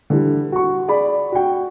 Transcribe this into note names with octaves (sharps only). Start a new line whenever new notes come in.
D3 E3 G3
F#4 C#6
G#4 D5 B5
F#4 G5